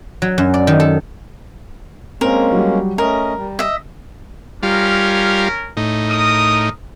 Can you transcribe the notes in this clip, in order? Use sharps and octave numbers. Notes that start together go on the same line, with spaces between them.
F#3
F#2
D5
D#3
A4
G#3 A#3 C4 C#4 A#4
F#3 G3
A3 C#4 A#4 D#5 A#5
G3
D#5 E5
G3 C#4 F4 A#4
A2 D#4
A#4 D#6